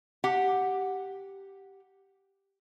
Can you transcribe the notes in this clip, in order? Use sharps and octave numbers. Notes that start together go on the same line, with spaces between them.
G4 F#5